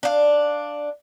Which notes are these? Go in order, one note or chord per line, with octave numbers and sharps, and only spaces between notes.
D4 F5